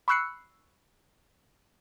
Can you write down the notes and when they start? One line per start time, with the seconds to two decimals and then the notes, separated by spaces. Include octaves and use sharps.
0.08 B5 C#6 E6 F#6 C7 C#7